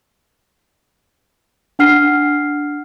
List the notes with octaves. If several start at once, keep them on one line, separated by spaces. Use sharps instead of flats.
D4 F#5 F6 C7